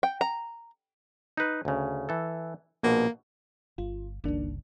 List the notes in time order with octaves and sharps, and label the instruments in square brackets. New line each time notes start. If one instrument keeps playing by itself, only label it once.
[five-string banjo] G5
A#5
[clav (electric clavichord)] D#4 B4
D2 C#3
E3 A4
[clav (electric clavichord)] A#1 B2 [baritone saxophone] A#3
[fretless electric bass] G1 [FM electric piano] F4
[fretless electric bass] G1 C#2 [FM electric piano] D#3 A#3 D4